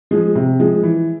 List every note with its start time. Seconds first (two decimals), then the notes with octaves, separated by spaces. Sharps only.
0.11 F3 G#3
0.35 C3
0.60 F3 G#3
0.83 E3